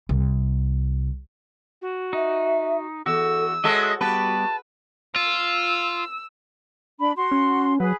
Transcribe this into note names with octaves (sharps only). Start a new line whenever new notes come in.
C2
F#4
D#4 E5
E2 F#4 A4 E6
G#3 F#4 A4 C#5 D#5 E5
G3 B3 F#4 G4 B4 A5
F4 E6
D4 B5
F#4 C6
C#4
F#3 G#4 B4